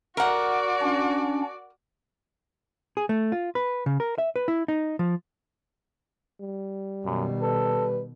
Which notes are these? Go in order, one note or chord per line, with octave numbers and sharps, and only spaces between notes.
F#4 A#4 D5 F#5
C#4 D4
G#4
A3
F4
B4
C#3
A#4
E5
B4
E4
D#4
F3
G3
F#2 B2 D#3
A4 B4